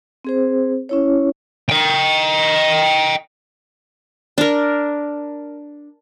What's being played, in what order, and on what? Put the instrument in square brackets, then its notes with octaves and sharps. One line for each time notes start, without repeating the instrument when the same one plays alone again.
[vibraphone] C4 G#4 C5
C#4 E4 C#5
[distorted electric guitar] D#5 G5
[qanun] D4 A#4